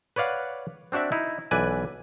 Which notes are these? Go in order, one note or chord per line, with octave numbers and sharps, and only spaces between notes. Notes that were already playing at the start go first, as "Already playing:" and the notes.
B4 C#5 D5 F5 F#5
C4 D4 F#4 D5 E5
D#4 E4
B1 E3 B4 D5 G#5